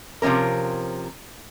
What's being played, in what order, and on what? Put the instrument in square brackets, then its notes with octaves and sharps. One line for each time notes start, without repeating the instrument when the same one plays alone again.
[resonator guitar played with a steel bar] C3 F3 G#3 C#4 A#4